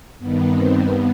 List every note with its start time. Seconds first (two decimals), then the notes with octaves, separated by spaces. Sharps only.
0.19 G2 D#3 B3
0.50 C4
0.81 G2 B3